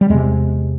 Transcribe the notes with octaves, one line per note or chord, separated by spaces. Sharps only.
G3
E2 C3 G#3